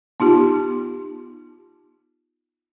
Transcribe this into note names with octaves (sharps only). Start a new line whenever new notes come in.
B3 D#4 F4 G4